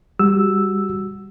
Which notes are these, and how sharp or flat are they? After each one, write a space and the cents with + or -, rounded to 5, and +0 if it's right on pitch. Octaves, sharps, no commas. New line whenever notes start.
G3 +20 F#4 +0 E6 +0